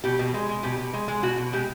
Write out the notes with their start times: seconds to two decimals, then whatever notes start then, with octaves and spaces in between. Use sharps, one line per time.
0.04 B2 G4
0.19 B2
0.34 G#3
0.49 G#3
0.63 B2 G4
0.78 B2
0.94 G#3
1.08 G#3
1.23 B2 F#4
1.37 B2
1.53 G#3 G4